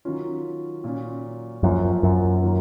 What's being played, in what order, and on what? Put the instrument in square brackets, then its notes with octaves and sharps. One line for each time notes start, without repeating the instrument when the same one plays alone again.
[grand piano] D#3 F#3 C#4 F4
A#2 F#3 C#4 F4
[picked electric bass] F#2 [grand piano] F3 A#3 F4
[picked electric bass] F#2
[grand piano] D#3 F#3 A#3 F4